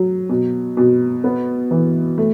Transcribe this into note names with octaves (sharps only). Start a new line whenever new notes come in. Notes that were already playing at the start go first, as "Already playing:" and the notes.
Already playing: F#3
B2
B2
B3
E3
A3